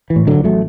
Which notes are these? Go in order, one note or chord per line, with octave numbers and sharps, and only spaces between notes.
E3
A2
D3 F#3
A1
F#3 A3